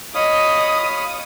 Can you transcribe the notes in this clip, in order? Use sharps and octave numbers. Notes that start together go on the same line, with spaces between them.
C#5 D#5 F5 B5 D#6